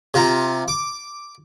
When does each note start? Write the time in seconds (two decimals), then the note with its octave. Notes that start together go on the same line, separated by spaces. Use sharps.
0.14 C3 F4 A#5
0.68 D6